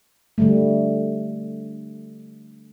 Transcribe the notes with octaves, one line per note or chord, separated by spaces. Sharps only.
D3 G3 A3